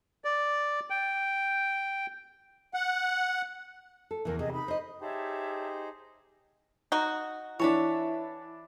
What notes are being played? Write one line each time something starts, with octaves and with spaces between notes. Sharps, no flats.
D5
G5
F#5
A4
E2 C#3 E3 A#4
C3 G#4 D#5
D#4 B5
C5 D#5
D#4 G4 G#4 C5 C#5 E5 A5
D#4 F#4
E3 D4 E4 C#5 A5 B5